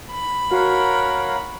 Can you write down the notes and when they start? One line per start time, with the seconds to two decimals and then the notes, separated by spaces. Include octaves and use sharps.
0.13 B5
0.51 F#4 A#4 C#5 F5 F#5